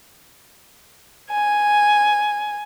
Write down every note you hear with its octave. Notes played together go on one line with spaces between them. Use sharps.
G#5